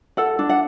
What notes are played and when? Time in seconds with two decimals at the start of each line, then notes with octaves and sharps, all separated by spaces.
0.17 A4 F#5
0.39 D4
0.49 F#5